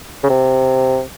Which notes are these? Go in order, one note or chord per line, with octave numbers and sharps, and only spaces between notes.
C#3
C3